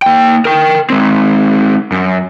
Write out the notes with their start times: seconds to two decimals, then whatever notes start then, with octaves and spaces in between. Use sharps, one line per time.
0.02 A#3 G5
0.45 A#4 G5
0.90 G#3 C4
1.92 F#2